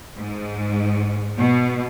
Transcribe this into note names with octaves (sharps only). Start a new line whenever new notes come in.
G#2
B2